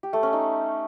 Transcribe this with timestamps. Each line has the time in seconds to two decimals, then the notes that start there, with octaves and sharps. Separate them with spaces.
0.03 G4
0.13 A3
0.23 C#4
0.33 D#4